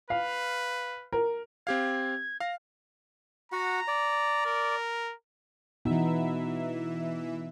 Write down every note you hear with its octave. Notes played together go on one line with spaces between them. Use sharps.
B4 F5
A#4
C4 G4 F5 G#6
F5 F6 A#6
F#4 F#5 A#5
D5
A#4
B2 E3 B3 D#4 E5